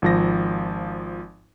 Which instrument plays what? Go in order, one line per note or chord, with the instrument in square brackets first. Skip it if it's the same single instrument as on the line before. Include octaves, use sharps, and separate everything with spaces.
[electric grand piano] G#1 F3 A#6